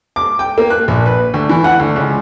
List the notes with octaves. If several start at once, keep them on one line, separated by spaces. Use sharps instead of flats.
D6
G5
A#3
F#6
A#1
B4
D2
E3
F#5
D2
C#2